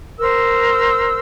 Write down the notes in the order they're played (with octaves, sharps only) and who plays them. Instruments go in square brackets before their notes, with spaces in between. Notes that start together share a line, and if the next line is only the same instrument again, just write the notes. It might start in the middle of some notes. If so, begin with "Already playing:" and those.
[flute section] A#4 C5 E6